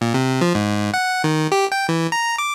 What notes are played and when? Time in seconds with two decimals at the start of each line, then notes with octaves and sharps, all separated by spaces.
0.01 A#2
0.14 C3
0.41 F3
0.55 G#2
0.94 F#5
1.24 D#3
1.52 G4
1.72 G5
1.89 E3
2.12 A#5
2.38 D6